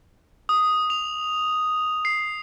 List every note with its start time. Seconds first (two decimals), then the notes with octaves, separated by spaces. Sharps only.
0.49 D#6
0.90 F7
2.05 C7